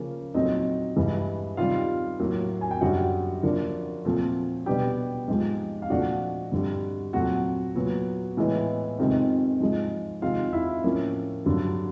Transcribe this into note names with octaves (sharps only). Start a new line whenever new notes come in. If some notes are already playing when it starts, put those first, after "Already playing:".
Already playing: C#3 F3 A#3 C#4
A#2 F#3 A3 C4 D#4 D#5
G2 E3 G#3
C3 D#3 G3 F4 F5
A2 F#3 A#3
G#5
G5
F#2 D3 G3 F#4 F#5
D3 F3 A#3 D4
A#2 F3 A3 C4
B2 G3 B3 D4 G4 G5
G#2 F3 G#3
F5
A#2 F3 A3 D4 F#4 F#5
G2 D3 G3
A#2 F#3 A3 C4 F#4 F#5
A#2 F#3 B3
A2 E3 G#3 B3
F2 C3 D#3 G#3 C4
G#2 F3 G#3
C3 D#3 G#3 C4 F4 F5
E4 E5
A2 F3 A#3 C#4
G2 D3 F#3